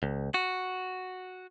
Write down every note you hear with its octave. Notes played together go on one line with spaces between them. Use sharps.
C#2
F#4